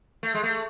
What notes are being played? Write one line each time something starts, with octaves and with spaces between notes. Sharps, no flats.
A3
G#3
A3